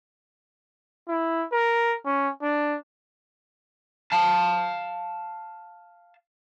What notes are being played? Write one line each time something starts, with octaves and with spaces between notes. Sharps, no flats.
E4
A#4
C#4
D4
F5 A5